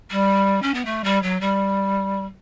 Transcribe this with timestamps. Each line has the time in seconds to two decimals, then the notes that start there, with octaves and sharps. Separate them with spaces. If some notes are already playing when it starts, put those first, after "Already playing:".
0.11 G3
0.62 C#4
0.74 B3
0.85 A3
1.04 G3
1.22 F#3
1.41 G3